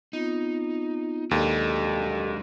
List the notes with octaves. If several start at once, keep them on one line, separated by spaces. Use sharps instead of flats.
B3 C4 D#4 F4
D#2 F#3 G#3 D4 G4 A4 D#5